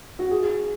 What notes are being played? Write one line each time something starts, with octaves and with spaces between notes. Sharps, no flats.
F#4
G#4